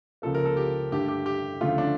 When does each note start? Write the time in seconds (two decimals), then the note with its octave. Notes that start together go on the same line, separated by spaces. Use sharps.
0.22 C#2 C#3 F3 A#3 A4
0.35 A#4
0.45 A4
0.57 G4
0.92 G2 D3 A3 G4
1.08 G4
1.26 G4
1.61 D2 C#3 F3 A3 F4
1.78 D4